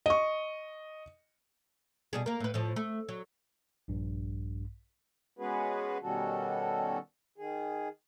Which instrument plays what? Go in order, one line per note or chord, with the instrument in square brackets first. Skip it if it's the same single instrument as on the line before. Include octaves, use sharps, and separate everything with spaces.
[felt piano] D#5 C#6
[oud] B2 G3 G#4
A#3 A#4
A2 B4
A2 F3
A3
F#3
[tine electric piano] A#1 G2
[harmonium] G#3 B3 C#4 F#4 G#4 B4
B2 D#3 G3 C#4 F#4 A4
D#3 G#4